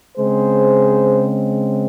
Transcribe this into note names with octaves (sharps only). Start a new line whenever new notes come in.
C#3 G#3 C4 G#4 C5